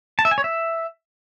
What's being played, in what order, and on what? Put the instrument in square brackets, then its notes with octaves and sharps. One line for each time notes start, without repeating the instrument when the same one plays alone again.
[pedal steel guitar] A5
E5
G#5
C#5
E5